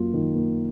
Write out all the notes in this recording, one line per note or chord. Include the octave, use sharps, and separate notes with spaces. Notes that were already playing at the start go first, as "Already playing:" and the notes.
Already playing: F#2 A#3 F4
D#3
A#3